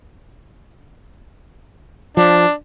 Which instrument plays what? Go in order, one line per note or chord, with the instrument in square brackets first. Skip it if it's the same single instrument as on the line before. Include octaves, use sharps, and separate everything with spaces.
[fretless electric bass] F3 [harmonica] D4